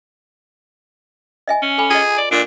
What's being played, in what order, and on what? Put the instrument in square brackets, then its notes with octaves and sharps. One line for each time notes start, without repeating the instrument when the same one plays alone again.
[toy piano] D#5 E5 G#5
[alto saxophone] C#4
[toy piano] A4 G#5 B5
[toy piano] F4 D#5 [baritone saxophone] G#4
[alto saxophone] D5
[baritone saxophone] A#2 [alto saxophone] D4